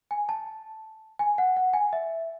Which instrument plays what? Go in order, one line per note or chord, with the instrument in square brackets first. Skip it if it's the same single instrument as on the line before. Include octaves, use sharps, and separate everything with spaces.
[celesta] G#5
A5
G#5
F#5
F#5
G#5
E5